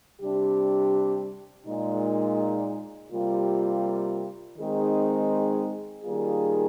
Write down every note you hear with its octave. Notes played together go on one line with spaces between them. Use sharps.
C3 G3 D4 G4
A#2 G#3 D#4
C3 G3 A#3 F4
D#3 G#3 C4 D#4 G#4
D#3 G3 A#3 F4 G#4